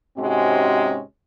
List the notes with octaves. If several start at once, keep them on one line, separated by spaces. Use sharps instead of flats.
G#2 C3 G#3 C4 C#4 F#4